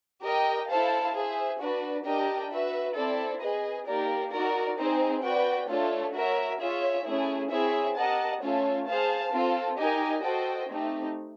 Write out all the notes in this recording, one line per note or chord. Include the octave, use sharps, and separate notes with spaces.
G4 A#4 D#5 G5
E4 A4 C5 F5 A5
G#4 C5 E5
D4 F#4 B4 D5
D4 G4 A#4 D#5 G5
F#4 B4 E5
C4 E4 A4 D5
G#4 B4 D#5
A#3 D#4 G4 A#4 D5
D#4 F#4 A#4 D5
C4 D#4 G#4 C5
F#4 B4 D5 G5
A3 D4 F4 A4 C#5
F#4 A#4 C#5 E5
F4 G#4 C#5 E5
A3 C#4 E4 G#4
C4 E4 G#4 C#5 E5
G4 A#4 D#5 F#5 A5
A3 C#4 F4 A4 C#5
G#4 C5 F5 A5
C4 F4 A4
D#4 G4 A#4 D#5 G#5
F#4 A4 C5 D#5 G5
A3 C4 D#4 G4